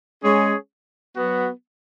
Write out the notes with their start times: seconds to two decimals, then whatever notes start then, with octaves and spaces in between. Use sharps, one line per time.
0.23 G#3 C#4 G#4 C#5
1.15 F#3 B3 F#4